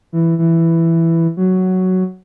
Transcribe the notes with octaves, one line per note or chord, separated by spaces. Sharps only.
E3
E3
F#3